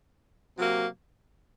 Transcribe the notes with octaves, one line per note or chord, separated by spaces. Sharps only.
C3 F#3 A#3